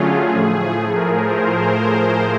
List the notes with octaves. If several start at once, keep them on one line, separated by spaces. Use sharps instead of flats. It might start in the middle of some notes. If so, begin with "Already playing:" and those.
Already playing: D3 F#3 A3 C#4 F4 G#4
A2 F3 A3
A#4
C5